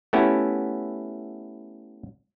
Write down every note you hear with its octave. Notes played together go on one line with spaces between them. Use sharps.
A3 B3 C#4 E4 F#4 G4